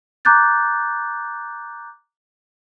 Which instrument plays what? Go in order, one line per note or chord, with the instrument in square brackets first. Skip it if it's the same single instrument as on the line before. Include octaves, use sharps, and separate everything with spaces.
[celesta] A#5 D6 F#6 G6 A6